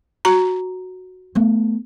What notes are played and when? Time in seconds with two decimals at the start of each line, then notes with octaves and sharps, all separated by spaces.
0.25 F#4 A#5
1.35 A3 B3